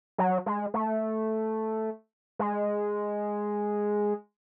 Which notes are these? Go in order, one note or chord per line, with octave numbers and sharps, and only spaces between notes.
F#3
G#3
A3
G#3